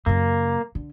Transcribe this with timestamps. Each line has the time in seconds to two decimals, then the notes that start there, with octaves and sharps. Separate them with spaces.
0.06 F#2 C#3 A#3
0.75 D3